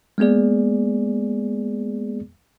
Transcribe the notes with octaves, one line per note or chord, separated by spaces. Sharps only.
G#3 A#3 B3 G#4 D5